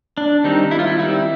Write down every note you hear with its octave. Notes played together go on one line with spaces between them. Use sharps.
D4
D#3 G3 C4 D#4
E4
F4
E4
D#3 G3 C4 E4